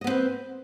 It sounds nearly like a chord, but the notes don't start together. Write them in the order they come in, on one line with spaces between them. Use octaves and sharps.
D#5 B3 C4 B4